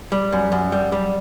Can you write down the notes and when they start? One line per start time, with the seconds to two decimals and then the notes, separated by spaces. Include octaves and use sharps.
0.12 G3
0.32 F#2
0.52 F#2
0.72 G3
0.92 G3